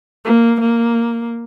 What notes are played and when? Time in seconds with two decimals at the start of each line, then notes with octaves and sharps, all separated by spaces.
0.25 A#3
0.61 A#3